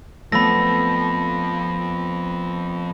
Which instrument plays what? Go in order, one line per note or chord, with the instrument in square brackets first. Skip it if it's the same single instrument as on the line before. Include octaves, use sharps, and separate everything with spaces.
[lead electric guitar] F2 F3 [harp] A3 B3 [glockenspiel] B5 A#6